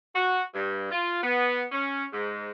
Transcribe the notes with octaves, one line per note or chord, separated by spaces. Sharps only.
F#4
G2
F4
B3
C#4
G#2